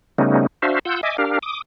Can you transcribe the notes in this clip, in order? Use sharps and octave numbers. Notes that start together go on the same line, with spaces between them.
C#3 G3 A3 B3 C#4 D#4
D4 F#4 C5 E5 F5
F4 F#5 E6 G6
D#5 E5 G#5 D6
D4 G4 A#4 F5
D6 D#6